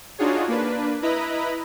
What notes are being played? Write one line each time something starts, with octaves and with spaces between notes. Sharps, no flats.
D4 D#4 F4 F#4 G#4 C#5
A#3 D4 B4
E4 B4 D#5 A#5 B5